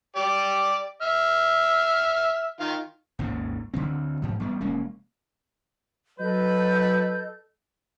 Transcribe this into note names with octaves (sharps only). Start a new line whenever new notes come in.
G4 D5
E5 F6
D#3 F4 F5
G#1 D#2 G#2 C#3
D2 D3 D#3 C4
G#2 F3
A1 G3 B3
F1 G#3 A#3 C#4
F#3 A4 B4 D#5 G6